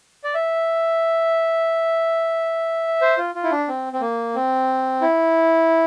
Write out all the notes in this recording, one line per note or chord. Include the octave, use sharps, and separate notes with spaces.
D5
E5
C5
F4
F4
E4
D4
C4
C4
A#3
C4
E4